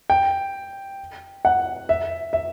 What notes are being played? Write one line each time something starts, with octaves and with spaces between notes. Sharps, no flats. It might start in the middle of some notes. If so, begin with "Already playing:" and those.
G5
F#5
E5
E5